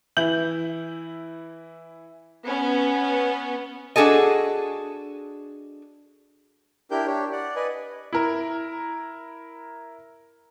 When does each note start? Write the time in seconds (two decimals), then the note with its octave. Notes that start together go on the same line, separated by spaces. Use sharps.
0.17 E3 E4 G6 F#7
2.45 B3 C#4
3.96 D4 F#4 G#4 A4 D#5
6.91 D4 E4 G4 A#4 G5 G6
7.06 D4 G4 C#5
7.32 D5 F#5
7.56 B4 D5 D#5 G#5
8.13 E4 A#4